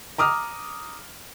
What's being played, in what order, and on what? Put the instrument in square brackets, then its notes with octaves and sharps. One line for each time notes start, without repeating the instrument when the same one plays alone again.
[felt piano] A#5 D6 D#6 F6